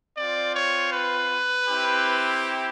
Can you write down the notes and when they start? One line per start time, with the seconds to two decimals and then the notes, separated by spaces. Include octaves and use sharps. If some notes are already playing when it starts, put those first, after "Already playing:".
0.17 C4 F4 D5
0.55 C#5
0.93 B4
1.68 C4 E4 G4